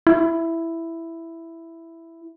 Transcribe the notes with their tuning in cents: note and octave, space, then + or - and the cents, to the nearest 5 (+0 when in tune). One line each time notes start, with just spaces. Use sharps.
E4 +5